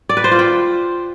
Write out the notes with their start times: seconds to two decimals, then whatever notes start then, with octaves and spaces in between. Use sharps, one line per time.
0.09 D5
0.17 B4
0.24 C5
0.31 F4
0.39 G5